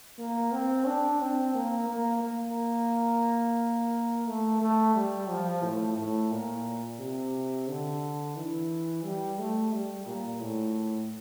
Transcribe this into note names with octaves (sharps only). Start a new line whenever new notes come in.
A#3
C4
D4
C4
A#3
A#3
A#3
A3
A3
G3
F3
A2
A2
A#2
C3
D3
E3
G3
A3
G3
A#2
A2